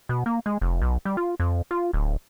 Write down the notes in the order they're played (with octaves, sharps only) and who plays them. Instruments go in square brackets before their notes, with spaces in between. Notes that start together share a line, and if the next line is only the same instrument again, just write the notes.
[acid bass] B2
A#3
G#3
F1
B1
G3
F4
F2
F4
D1